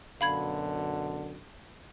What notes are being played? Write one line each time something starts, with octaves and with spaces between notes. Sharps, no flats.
F#2 B2 D3 F5 B5 G#6